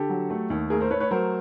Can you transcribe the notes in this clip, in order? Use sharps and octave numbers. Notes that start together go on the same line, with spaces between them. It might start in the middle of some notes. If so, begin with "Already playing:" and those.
Already playing: D3 G4 A4
F#3
A3
D#2
A3 G#4 A#4
A#4 C5
A3 B4 C#5
B4 C#5
F#3 A#4 C5